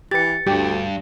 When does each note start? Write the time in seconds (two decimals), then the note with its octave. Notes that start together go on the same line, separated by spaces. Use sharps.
0.11 E3 G4 B4 A6 C#7
0.47 D2 G2 G4